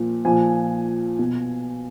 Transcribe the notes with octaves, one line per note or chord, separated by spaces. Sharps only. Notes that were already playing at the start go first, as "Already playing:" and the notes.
Already playing: A#2 F3
A#2 F3 G#5
B2